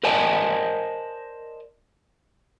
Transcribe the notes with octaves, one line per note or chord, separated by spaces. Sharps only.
A#4 C5 D5 D#5 G#5 A5